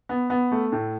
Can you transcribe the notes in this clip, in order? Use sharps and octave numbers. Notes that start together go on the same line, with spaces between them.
B3
B3
A3
A2